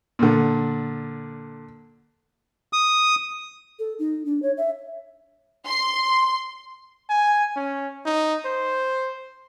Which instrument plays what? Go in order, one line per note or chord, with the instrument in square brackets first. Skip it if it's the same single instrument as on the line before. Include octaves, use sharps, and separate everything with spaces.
[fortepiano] A#2 D3
[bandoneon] D#6
[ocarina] A4
D#4
D4
C#5
E5
[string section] C6
[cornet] G#5
C#4
D#4
C5